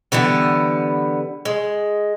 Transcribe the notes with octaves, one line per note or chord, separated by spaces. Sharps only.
D3 E3 G3 B3
G#3